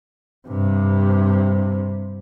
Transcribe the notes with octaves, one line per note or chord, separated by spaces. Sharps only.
G2 C3